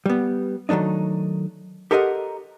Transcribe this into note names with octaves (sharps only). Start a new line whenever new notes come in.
G3 B3
D#3 F#3 A3 D4 D#4
G4 A4 A#4 C5 D#5 F#5